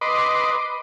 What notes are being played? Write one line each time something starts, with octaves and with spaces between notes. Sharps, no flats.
B4 D#5 C6 D6